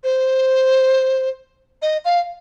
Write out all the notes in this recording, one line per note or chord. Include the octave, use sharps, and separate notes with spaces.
C5
D#5
F5